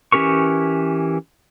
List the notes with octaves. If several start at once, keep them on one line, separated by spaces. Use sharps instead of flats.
E3 C#4 G4 A#4 C#6